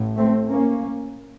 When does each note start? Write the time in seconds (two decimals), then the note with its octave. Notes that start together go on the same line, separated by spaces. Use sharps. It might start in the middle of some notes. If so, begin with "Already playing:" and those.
Already playing: A1 A2
0.17 A3 C4
0.48 A#3 C#4